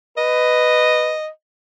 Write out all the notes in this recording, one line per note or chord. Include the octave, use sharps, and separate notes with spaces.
B4 D#5